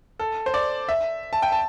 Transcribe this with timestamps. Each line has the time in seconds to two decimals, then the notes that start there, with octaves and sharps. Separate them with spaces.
0.19 A4
0.46 C5
0.54 D5
0.89 E5
1.33 A5
1.42 G5
1.52 A5